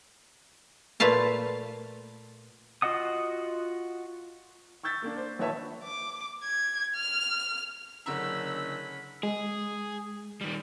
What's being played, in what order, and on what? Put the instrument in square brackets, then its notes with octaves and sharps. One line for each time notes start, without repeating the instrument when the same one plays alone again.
[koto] A#2 A3 F4 B4 F5 A5
[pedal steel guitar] F4 F#4 D#5 F#5 D#6
[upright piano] C#6 E6 G6 A6 B6
A#3 D4
C5
A#1 D#3 B4 C#5 E5 A5
[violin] D6
G#6
F6
[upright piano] F#1 D3 A#5 [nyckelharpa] C#4 B5 [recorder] E6
[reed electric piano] G#3 [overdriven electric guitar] G#4
[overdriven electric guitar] D#3 G3